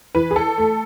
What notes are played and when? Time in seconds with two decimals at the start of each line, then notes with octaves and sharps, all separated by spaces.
0.15 E3 B4
0.31 G#4
0.36 A4
0.58 A3